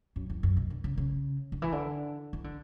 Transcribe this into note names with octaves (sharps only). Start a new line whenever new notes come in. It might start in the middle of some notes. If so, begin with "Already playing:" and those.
F#2
E2
F#2
B2
D3
C#3
C#3
D3
E3
D3
E3
D3